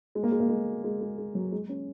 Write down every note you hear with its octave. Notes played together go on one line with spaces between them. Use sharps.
G#3
A#3
G#3
A#3
G#3
G#3
G#3
G#3
F#3
G#3
C#4